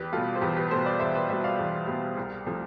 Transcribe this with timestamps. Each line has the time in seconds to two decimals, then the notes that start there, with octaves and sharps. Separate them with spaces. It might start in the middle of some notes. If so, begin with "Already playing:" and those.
Already playing: E2 G4 B4
0.12 B2 G3 F4 A4
0.35 C5
0.41 E2 G4 B4
0.56 G4 B4
0.71 B2 G3 A4 C5
0.86 B4 D5
1.00 E2 C5 E5
1.15 B4 D5
1.29 B2 G3 C5 E5
1.44 D5 F5
1.59 E2
1.87 B2 G3
2.17 C2
2.46 C3 F3 A3